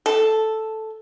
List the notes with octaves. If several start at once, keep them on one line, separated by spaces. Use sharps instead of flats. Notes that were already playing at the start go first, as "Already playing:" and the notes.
A4